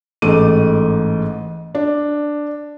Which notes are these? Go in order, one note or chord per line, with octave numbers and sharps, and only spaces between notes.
A1 G#2 A3 D6 D#7
D4